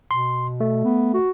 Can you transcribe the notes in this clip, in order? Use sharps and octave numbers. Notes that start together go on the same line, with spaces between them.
B2 C6
A3
B3
F#4